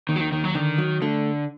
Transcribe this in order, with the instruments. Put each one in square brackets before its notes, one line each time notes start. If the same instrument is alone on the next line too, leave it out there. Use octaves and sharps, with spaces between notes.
[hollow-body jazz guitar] D#2 [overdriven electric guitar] D#3
[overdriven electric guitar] F#3
D#3
[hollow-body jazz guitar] D#2 [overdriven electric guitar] D#3
[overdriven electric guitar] F#3
[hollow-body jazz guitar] D3 [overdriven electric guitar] D#3
[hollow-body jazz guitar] F#3
[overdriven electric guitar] D3 [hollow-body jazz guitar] A3